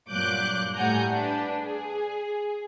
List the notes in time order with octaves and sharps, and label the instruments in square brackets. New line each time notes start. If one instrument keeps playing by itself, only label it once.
[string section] G2 A#2 F#3 D6 F#6 G6
A2 G3 F#5 G#5 A#5 G6
D4 B4
G#4